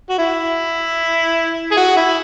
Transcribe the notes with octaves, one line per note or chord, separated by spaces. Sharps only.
F#4
E4
G#4
F#4
E4